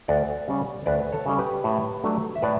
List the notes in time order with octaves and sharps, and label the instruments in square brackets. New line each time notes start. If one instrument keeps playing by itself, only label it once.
[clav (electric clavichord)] D2 D5 F#5
C#3 G3 C#4
D2 B4 D5
A4 C#5
C#3 G3 C#4
G4 B4
A2
F#3 A3 D4
E5
A2 B4 D5